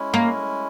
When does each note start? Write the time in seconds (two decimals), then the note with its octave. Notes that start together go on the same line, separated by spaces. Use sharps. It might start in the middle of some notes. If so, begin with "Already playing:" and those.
Already playing: G#3 C#4 E4
0.14 A#3